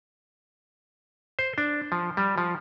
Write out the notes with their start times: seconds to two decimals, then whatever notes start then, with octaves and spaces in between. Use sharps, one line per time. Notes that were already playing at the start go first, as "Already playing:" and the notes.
1.39 C5
1.58 D4
1.92 F3
2.17 G3
2.38 F3